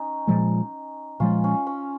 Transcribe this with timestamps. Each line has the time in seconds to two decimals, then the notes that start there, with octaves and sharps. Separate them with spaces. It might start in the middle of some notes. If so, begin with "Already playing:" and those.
Already playing: C#4 D#4
0.27 A#2 F3 G#3
1.20 A#2 F3 G#3 C#4 F4
1.44 C#4
1.67 C#4